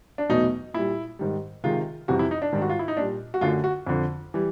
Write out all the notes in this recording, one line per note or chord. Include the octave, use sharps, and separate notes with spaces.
D4
E2 B2 F#3 A3 D#4
A#2 G3 E4
G#2 D#3 G3
C3 D#3 G#3 F4
F2 C3 E3 G3 F#4
E4
D#4
D4
G#2 D#3 G3
F#4
F4
E4
D#4
A#2 G3 D4
F#4
F#2 D3 F#3 A3 F4
F#4
F2 D3 F3
E3 G3